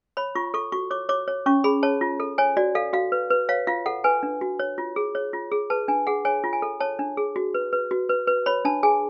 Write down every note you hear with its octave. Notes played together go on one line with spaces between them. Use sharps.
C#5 B5
F4 C#6
A4 C#6
F#4 C#6
C#5 D6
C#5 D6
C#5
C#4 C#6
G#4 B5
C#5 A5
F4
A4
C#5 G#5
F#4 D5
A4 F5
F#4 F5
B4
B4
C#5 F5
F4 F5
A4 F#5
B4 G#5
D4
F#4
C#5
F4
G#4
C#5
F4
G#4
B4 A5
D4 G#5
G#4 F#5
C#5 G#5
F4
G#5
A4
C#5 A5
D4
G#4
F#4
B4
B4
F#4
B4
B4
C#5 B5
D4 A5
G#4 G#5